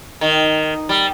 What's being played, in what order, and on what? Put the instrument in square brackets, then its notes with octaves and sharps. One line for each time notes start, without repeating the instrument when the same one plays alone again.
[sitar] D#3
G3